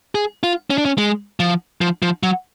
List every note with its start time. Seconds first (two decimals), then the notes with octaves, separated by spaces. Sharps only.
0.15 G#4
0.43 F4
0.70 C#4
0.78 D4
0.85 C#4
0.98 G#3
1.40 F3
1.81 F3
2.02 F3
2.23 F#3